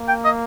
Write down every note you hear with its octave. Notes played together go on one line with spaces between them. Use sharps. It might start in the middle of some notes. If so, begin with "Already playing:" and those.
Already playing: A#3
G5
D#5